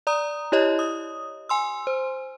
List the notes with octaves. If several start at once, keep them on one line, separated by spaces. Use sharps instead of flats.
D5 A#5 D#6
E4 G4 C#5 D#5
D#6
G#5 C6 E6
C5